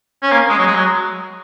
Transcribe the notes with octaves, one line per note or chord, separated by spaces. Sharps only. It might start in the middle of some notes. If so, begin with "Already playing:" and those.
C#4
A#3
G#3
F#3
G#3
F#3